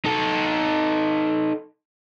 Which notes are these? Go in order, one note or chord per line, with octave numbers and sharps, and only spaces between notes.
D#4 A4